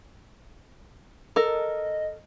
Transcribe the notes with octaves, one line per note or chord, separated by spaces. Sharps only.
A4 A#4 D#5